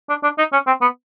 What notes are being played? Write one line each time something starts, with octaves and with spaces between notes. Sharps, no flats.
D4
D4
D#4
C#4
C4
B3